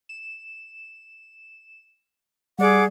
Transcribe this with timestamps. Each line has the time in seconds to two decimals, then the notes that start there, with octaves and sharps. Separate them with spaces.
0.09 E7
2.59 G3 G#4 D5 F#5 D6